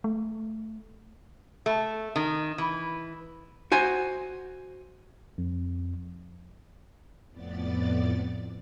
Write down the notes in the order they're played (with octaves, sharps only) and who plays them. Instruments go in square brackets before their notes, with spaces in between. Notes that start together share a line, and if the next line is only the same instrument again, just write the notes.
[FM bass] A3
[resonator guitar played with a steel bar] A3
D#3
E3
[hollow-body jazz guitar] F#4 C5 G#5
[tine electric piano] F2
[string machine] F2 A2 B3 D5 A6